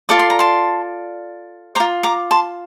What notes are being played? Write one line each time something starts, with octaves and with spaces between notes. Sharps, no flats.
F4 A4 D5 D6
C6
A#5
A5 C6
C5 A#5 D6
F4
A#5 D6
A5 C6